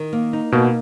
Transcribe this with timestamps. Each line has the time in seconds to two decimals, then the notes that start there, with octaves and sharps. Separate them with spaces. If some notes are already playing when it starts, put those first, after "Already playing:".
Already playing: D#3
0.13 A#3
0.33 D#4
0.52 B2 A#3